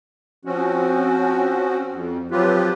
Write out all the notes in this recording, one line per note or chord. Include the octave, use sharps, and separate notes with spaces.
F3 C4 C#4 F#4
F2
F3 F#3 C4 F4 G4 B4